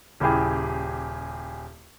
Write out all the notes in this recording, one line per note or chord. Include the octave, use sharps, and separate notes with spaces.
D#1 C#3 E4 G4 G#4